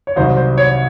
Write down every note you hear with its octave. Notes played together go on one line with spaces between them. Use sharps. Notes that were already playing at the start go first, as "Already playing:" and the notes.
C#5
C2 C3 D#3 F#3 C5
C5
C#5